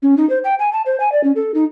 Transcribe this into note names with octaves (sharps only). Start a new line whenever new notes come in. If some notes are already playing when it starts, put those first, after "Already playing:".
C#4
D#4
C5
G5
G#5
A5
C5
G#5
D5
C#4
A4
D#4